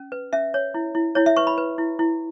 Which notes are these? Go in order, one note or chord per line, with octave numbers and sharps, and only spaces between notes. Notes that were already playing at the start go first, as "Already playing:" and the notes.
Already playing: C#4
B4
C#4 E5
C#5
E4
E4
E4 C#5
E5
B4 C#6
B5
B4
E4
E4